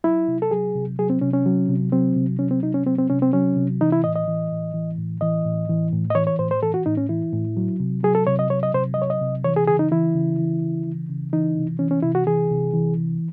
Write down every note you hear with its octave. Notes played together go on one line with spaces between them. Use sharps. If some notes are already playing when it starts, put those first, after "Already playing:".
F#3 E4
C3
A4
F#3 G#4
C3
F#3 G#4
C4
C3 C#4
C#4
F#3
C3
F#3 C4
C3
F#3 C#4
C4
C3 D#4
C#4
F#3 C4
C4
C3 C#4
C4
F#3 C#4
C3
E3 D#4
E4
A2 D#5
D#5
E3
A2
E3
A2
E3 D#5
A2
E3
A2
D#5
E3 C#5
C#5
A2 C5
C5
E3 A4
F#4
A2 D#4
C#4
E3 E4
A2
F#3
C3
F#3 G#4
A4
C3 C#5
D#5
F#3 C#5
D#5
C3 C5
D#5
F#3 C#5
D#5
C3
E3 C#5
G#4
C#3 G#4
D#4
E3 E4
C#3
E3
C#3
E3
C#3
E3 D#4
C3
E3 C#4
C#4
C3 E4
F#4
E3 G#4
C3
E3
C3